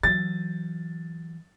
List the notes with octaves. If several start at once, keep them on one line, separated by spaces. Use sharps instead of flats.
E3 F#3 A6